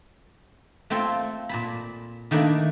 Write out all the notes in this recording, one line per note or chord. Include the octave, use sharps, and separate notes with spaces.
A3 A#3 C4 F4 A4
A#2 A5 B5
D#3 A3 A#3 D4 E4